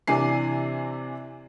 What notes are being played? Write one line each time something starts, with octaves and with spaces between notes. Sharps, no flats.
C3 E3 D4 G#5 C7